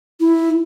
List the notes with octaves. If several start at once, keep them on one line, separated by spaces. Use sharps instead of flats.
E4